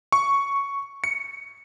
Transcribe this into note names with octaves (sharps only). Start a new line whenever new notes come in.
C#6
C#7